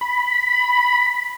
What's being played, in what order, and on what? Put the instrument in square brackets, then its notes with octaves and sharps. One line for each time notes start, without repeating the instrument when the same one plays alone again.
[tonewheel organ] B5